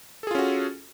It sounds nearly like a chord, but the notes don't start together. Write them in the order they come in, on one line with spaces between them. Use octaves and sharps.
A4 G#4 F4 C#4 F#4